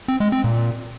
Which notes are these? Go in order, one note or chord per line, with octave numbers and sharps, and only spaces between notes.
C4
G#3
C4
A#2